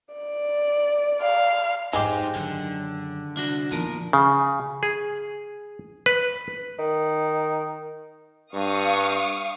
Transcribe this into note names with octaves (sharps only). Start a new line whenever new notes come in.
D5
F5
F2 G#2 G#3 D#4 G4 C5
F#2 D3 D#3
C2 D4 F#4
E2 A#2 F3 D#4 A#4
C#3
G#4
B4
D#3
G2 F5 C#6 D#6